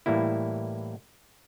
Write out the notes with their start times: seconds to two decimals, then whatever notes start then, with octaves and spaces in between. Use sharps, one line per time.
0.06 A2 E3 G3 A#3 E4